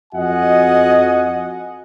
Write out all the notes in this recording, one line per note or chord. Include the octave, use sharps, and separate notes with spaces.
F2 F#4 D#5 F#5 G#5